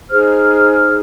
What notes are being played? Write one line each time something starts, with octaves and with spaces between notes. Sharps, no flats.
D#4 G#4 C5 F6